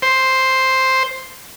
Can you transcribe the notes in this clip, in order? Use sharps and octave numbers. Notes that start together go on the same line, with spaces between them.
C5